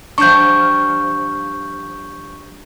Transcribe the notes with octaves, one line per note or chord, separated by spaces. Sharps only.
F3 G3 D4 C#6 G6